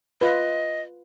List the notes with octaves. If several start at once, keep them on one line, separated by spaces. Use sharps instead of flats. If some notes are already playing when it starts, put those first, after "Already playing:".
F4 B4 D#5